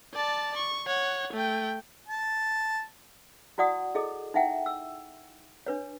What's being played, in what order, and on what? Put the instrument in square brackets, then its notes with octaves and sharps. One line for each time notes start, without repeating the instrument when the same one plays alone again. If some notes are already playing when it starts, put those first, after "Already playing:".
[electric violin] D5 A5
C#6
C#5 F#5
A3 G5
[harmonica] A5
[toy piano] E4 F#4 D5 F#5 D#6
E4 G#4 A4 D#5
D#4 E4 E5 F#5 G5
E6
D4 B4 C#5